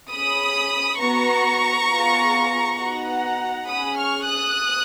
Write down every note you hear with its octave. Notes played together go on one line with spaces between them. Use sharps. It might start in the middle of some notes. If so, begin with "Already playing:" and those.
C#4 G#4 B5 D#6
B3 F#4 A#5 C#6
B3 F4 G#4
B3 D#4 F#4 F#5 A#5
C#4 G#4 B5 D#6
C#6 F6
D#6 F#6